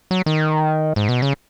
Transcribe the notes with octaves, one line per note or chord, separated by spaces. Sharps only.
F#3
D#3
G#2
B2
C#3